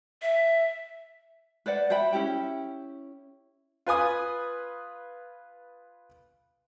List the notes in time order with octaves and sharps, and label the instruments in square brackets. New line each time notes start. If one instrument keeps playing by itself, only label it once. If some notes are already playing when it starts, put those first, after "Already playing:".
[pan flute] E5
[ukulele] B4 C5 D5 F#5
C5 E5 G5 B5
C#4 E4 G4 G5
[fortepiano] F4 B4 G#5 D#6